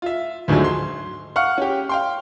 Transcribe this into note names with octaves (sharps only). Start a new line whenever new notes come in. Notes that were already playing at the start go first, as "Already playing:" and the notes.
F4 E5
D2 G#2 D3 F3 F#3
C6
F5 F#5 C#6 F6
C#4 G4
F5 G5 C6